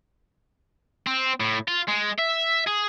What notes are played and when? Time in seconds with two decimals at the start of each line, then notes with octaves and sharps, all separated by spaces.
1.07 C4
1.40 A2
1.68 F4
1.88 G#3
2.19 E5
2.67 G#4